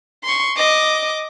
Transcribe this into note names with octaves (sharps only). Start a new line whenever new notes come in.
C6 C#6
D#5 D6